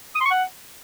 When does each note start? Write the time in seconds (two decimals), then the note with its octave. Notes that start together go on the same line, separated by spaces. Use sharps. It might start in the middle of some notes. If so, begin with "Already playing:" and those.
0.15 D#6
0.20 C6
0.26 C#6
0.31 F#5